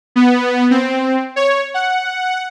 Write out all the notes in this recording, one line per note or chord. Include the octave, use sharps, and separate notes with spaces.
B3
C4
C#5
F#5